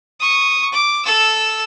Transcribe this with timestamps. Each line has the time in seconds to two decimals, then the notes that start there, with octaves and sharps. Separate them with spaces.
0.20 C#6 D#6
0.73 D6
1.05 A4 E6